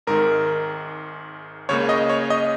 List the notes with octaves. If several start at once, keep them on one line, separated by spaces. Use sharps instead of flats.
G#1 G#2 D#3 A#4
C#2 C#3 A#3 C#5
D#5
C#5
D#5